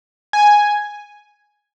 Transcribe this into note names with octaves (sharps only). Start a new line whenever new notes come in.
G#5